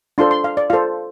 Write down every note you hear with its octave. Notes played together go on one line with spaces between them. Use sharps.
D4 F4 A4 C5 C6
C6
F5
D5
F4 A4 C5 F5